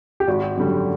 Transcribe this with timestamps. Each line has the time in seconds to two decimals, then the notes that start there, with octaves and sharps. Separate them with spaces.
0.20 G4
0.27 G#1 F#4
0.57 F#2 D3 G3